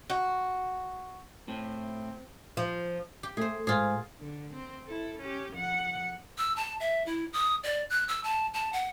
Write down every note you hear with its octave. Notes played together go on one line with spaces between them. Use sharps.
F#4
A2 C4
F3
G4
A3 G#4 C5
G#2 F4 G#4
D3
C4
E4 A4
C#4 G4
F2 F#5
E6
A5
E5
E4
D#6
D5
F#6
E6
A5
A5
F#5